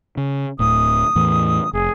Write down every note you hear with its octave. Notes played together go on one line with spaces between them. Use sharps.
C#3
D1 A2 D#6
E2 A2 E3
F1 G#4